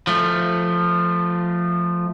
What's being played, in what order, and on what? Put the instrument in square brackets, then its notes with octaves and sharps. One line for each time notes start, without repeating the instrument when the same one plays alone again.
[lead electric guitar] F3 A3